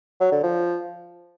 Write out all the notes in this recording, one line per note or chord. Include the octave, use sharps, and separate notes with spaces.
F#3
D3
F3